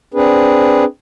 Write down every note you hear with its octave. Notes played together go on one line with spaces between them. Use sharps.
C4 D4 G#4 B4